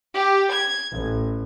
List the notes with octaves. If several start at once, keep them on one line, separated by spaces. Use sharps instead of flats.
G4
G#6
A1